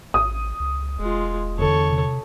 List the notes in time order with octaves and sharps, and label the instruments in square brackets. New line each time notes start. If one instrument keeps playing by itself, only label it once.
[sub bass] A1 [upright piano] D#6
[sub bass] C#2
[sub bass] E1 [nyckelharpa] G#3 F4
[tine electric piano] E2 D3 [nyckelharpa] A4 C#5
[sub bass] C3